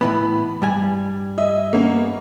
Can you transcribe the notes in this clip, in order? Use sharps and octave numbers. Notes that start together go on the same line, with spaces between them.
A2 E3 B3 B5
G2 G3 G#5
D#5 E5
A#3 B3 C#4